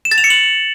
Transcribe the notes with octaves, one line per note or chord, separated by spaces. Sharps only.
E7
A6
F7
C#7
F#7